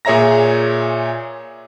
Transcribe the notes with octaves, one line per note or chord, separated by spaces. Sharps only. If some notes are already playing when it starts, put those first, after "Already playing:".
A#2 G#4 C#5 E5 A#5 A#6